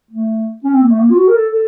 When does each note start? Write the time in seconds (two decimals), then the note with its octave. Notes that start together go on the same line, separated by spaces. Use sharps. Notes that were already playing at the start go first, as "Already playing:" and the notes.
0.11 A3
0.64 C#4
0.73 C4
0.82 A#3
0.91 A3
1.00 A#3
1.11 F4
1.17 F#4
1.28 A#4
1.35 A4
1.53 A4